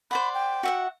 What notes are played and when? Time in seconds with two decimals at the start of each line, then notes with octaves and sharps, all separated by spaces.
0.11 C5 D5 F#5 B5
0.34 G5
0.63 F#4 E5 F#5